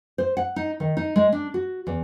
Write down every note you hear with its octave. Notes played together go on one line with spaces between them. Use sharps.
C5
F#5
D#4
D#3
D#4
G#3
D4
F#4
E2